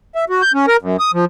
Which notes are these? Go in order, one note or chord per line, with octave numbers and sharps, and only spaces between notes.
E5
F#4
G6
C#4
A#4
F#2
D#6
F3